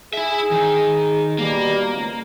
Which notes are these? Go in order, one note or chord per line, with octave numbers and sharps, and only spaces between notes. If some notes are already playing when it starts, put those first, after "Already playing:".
E4 G#4 E5
D#3
B2 G3 A#3
C#2